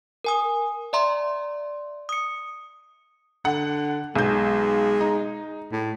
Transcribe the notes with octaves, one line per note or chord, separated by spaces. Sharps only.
A#4 G#5 D#6
D5 E5 A#5 C6
D#6 C#7
D3 F#5
B1 G#3 G6
D#4
A2